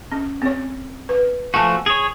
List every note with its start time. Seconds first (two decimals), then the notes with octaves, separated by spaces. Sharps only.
0.12 C#4
0.42 C4 C#5
1.09 B4
1.54 F3 A3 F#4 G#5 A5
1.86 G#4 C#5